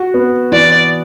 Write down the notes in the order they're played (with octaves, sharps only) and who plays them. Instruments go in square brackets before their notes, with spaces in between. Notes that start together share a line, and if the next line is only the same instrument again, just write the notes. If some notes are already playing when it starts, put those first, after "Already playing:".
Already playing: [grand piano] F#4
B3
[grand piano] E3 [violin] D5